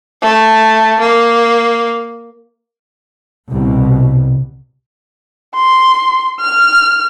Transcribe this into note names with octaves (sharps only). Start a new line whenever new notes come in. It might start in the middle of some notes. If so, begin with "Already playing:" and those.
A3
A#3
C2 B2
C6
F6